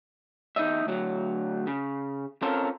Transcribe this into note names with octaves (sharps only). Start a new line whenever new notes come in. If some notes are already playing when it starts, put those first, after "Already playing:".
E2 D#4 D#5 E5
D2 F#3
C#3
C4 C#4 F4 A4 A#4